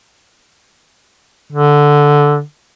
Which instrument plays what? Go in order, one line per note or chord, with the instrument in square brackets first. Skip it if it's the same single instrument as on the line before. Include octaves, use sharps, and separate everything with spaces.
[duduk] D3